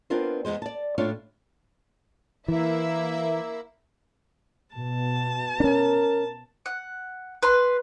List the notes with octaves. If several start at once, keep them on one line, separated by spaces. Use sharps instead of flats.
B3 C4 D4 F4 A#4 C5
E2 G2 G#3 C5
D5 A5
A2 A3 D4 F4 C#5 F5
E3 A#3 E4 E5
B2 A5
C#4 D4 A#4
F#5
B4 C6